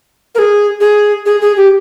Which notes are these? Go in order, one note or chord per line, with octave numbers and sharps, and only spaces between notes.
A#4
G#4
G#4
G#4
G#4
G4